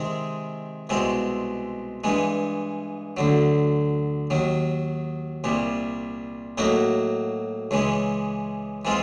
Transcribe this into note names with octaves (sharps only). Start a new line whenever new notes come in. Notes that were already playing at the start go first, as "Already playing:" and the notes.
Already playing: C3 D#3 G#3 C4 D#4
C2 B2 G#3 C4
G2 E3 G#3
D2 D3 F#3
D#2 D#3 F#3
C2 A#2 G3
A2 F#3 A#3 D#4 F#4
C#2 C#3 E3 G#3
E3 G#3 C4 F4